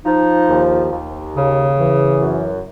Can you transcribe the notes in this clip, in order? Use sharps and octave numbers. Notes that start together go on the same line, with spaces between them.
F3 D#4
D#2
D#2
C#3
E3
F#2